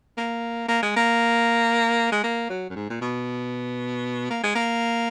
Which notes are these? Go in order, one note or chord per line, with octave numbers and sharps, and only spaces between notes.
A#3
A#3
G#3
A#3
G#3
A#3
F#3
F#2
G#2
A#2
B2
A#3
G#3
A#3